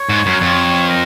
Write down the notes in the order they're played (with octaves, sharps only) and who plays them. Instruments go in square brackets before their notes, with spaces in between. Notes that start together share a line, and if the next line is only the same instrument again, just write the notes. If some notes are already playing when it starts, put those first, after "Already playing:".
Already playing: [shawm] C#5
[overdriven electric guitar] G#2
F#2
F2
[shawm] A#4